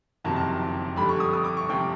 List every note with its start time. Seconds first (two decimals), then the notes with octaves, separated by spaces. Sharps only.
0.25 F#1 F2 C3 D#3 F#3 A5
0.36 A5
0.96 F2 D3 G3 B5
1.09 C#6
1.20 D#6
1.33 D#6
1.45 D6
1.57 C#6
1.68 F2 C3 F3 G5